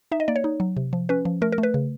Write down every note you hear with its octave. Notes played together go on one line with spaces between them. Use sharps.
D#4 E5
D#5
A#3 D5
C#5
D#4
F#3
C3
F3
C#4 B4
F3
A3 A#4
A#4
A3
B4
C#3